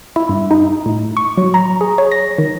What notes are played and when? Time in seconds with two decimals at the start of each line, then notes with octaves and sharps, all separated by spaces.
0.16 E4
0.29 G2
0.51 D#4
0.86 A2
1.17 C#6
1.38 F#3
1.54 A#5
1.81 G#4
1.98 C#5
2.12 A#6
2.38 D#3